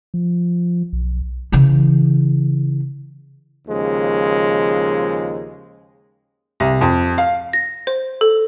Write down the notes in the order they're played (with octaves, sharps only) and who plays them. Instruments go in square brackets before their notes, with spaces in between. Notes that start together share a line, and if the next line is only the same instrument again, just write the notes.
[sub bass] F3
B1
[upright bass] C#3 E3
[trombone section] D#2 C#3 F3 G#3
[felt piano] C2
F2
F5
[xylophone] A#6
C5
A4